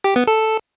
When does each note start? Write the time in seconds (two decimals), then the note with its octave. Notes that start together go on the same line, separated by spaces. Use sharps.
0.04 G4
0.16 B3
0.27 A4